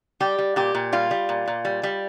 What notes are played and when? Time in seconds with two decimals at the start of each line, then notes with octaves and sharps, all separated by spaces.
0.20 G3 G4
0.39 G3
0.56 A#2 G4
0.75 A#2
0.93 G3 F4
1.11 G3
1.29 A#2
1.48 A#2
1.65 G3
1.83 G3